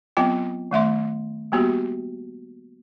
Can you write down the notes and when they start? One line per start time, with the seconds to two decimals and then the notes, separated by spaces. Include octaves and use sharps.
0.17 F#3 B3 C4 F4 G5
0.71 D#3 A3 E5 C6
1.52 G3 A#3 B3 F#4 G4